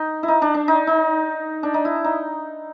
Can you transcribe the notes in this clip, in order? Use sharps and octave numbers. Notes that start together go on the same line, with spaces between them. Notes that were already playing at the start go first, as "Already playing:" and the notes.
Already playing: D#4
E4
D#4
D4
D4
D#4
D#4
D4
D#4
E4
D#4